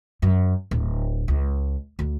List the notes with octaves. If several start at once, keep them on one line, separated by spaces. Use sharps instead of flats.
F#2
D1
C#2
D2